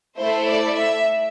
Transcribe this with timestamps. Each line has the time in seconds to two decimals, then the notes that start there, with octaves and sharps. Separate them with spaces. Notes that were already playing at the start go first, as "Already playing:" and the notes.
0.17 A3 E4 A4 C5
0.47 D5
0.76 E5